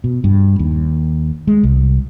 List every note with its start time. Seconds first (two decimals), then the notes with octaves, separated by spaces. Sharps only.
0.04 B2
0.24 G2
0.59 D#2
1.47 G#3
1.63 C2